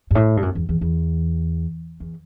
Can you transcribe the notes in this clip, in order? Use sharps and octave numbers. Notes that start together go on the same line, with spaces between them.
G2
A2
G2
F#2
E2
E2
E2
E2